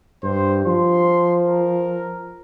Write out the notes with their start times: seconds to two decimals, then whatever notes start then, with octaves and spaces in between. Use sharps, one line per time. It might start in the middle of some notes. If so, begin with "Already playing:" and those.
0.23 G2 C5
0.66 F3 C6
1.46 A#4